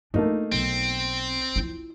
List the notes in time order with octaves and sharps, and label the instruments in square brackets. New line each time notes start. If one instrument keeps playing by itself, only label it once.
[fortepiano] A3 A#3 D#4 [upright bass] D4 F4
[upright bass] B1 [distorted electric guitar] C4
[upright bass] E4 F4